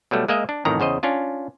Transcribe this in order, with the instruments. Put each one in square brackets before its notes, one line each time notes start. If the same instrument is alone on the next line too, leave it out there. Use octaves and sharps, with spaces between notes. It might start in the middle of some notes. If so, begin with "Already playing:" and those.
[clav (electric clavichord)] B2 F#3 G3 A3
G#3 A#3 D#5 E5
D4
A1 F2 A2 D#3 A#5
E2 C#3 C5 D#5
C#4 D4 F4